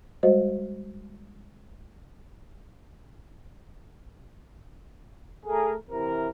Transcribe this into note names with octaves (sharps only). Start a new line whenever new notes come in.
G3 G#3 F#4 C5 D#5
A3 G#4 A#4
C3 E3 E4 A#4